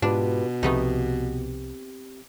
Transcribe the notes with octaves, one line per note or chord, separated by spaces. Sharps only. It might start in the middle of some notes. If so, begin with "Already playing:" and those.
G#2 B2 D4 F4 G4 B4
C2 C3 F3 A3 B3 C4 D#4 G4